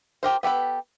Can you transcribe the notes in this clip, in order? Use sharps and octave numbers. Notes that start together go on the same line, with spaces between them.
F4 G4 A#4 C5
B3 G4 A4 B4